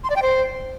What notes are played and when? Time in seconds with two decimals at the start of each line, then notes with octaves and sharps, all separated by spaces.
0.04 C6
0.10 D5
0.16 G5
0.22 C5